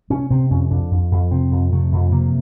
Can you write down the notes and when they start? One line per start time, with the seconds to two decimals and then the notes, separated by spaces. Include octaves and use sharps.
0.10 C3 C#4
0.30 C3 C4
0.51 F2 C#4
0.71 F2 D4
0.91 F2
1.12 F2
1.31 C3 C4
1.52 F2
1.71 C3 A3
1.92 F2
2.11 C3 A#3